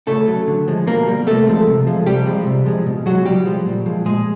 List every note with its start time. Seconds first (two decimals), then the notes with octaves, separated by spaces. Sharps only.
0.07 C#3 A3 A4
0.28 F#3
0.47 D3
0.68 F3 G#3
0.87 B2 A#3 A#4
1.07 G3
1.27 C3 A3 A4
1.47 F3 G#3
1.67 C3
1.87 F3 G#3
2.06 C3 G3 G4
2.26 F3 G#3
2.47 C3
2.66 F3 G#3
2.86 B2
3.06 F#3 G#3 F#4
3.26 C#3 G3 G4
3.46 F3 G#3
3.66 A#2
3.86 F3 G#3
4.05 A#2 G#3 G#4